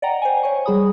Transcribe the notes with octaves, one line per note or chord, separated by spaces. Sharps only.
D5 D#5 F#5 G5 A#5
C5 G#5
C#5 G#5 C#6
G3 G#4 B5 D#6